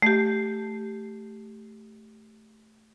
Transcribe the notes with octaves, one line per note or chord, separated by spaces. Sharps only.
A3 G4